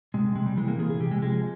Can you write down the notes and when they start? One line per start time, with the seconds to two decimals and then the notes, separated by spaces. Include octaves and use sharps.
0.14 C3 G#3
0.35 C3 G#3
0.46 G3
0.57 E3 G#3
0.68 A#3
0.79 C3 G#4
0.90 G#4
1.00 C3 G4
1.11 G#3
1.22 F3 G#3